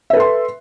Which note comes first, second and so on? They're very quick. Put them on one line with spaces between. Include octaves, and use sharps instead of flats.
E5 B4 A4 C6